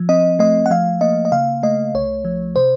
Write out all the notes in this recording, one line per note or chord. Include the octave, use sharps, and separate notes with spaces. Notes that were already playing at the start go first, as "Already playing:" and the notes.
Already playing: F3
C4 D#5
A3 D#5
F#5
F3 F5
A#3 D#5
D#5
C#3 F5
A3 D#5
C2 C#5
F3
C3 C5